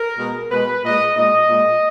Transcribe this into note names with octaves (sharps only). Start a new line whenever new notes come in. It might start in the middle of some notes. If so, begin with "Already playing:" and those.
Already playing: A#4
B2 G#3
B2 G#3 B4
A#2 G#3 D#5
A#2 G#3 D#5
A#2 G#3